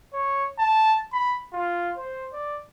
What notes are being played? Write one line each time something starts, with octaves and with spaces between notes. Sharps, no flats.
C#5
A5
B5
F4
C5
D5